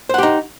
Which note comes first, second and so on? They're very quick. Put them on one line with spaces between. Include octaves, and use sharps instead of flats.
C5 F#5 G4 D#4